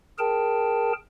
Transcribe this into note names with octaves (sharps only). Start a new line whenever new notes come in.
G#4 A#4 G5 A5